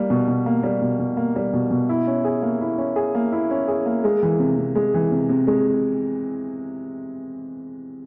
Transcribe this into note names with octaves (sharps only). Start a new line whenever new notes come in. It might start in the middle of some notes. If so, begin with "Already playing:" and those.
Already playing: G3 A#3
B2
B2
A#3
G3
B2
B2
A#3
G3
B2
B2
E4
C#4
G#4
A#3
E4
C#4
G#4
A#3
E4
C#4
G#4
A#3
G#3
E3
C3
C3
G#3
E3
C3
C3
G#3